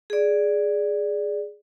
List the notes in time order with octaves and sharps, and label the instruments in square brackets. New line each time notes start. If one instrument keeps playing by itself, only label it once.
[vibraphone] G#4 D5